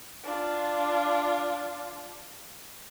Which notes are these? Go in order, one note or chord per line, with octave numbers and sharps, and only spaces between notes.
D4 F4